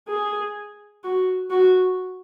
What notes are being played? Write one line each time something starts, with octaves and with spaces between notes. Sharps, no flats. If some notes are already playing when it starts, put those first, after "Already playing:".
G#4
F#4
F#4